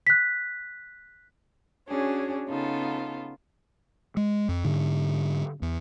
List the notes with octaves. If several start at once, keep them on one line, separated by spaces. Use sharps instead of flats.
F#6 B6
C#4 D4 F#4 G#4 C#5
C#3 B3 D#4 F4 A4
G#3
F2
G#2 D3
E2